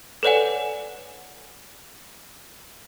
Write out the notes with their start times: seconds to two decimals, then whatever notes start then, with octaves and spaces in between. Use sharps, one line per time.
0.23 A4 B4 C#5 D5 F#5 G#5